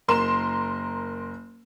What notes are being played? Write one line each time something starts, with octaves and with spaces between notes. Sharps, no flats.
F#1 A#4 C6 E7